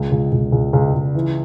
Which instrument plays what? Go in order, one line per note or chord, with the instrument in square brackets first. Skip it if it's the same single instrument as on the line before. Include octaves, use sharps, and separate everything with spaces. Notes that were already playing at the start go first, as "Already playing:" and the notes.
Already playing: [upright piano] C#2
C#2
C#2
C#2
C#2
C#2
E3